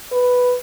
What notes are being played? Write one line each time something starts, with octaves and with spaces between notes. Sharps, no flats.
B4